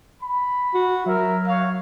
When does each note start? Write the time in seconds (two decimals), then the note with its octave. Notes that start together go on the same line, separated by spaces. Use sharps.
0.21 B5
0.74 F#4
1.06 F#3 A#4 E5
1.47 F#4 C#5 F5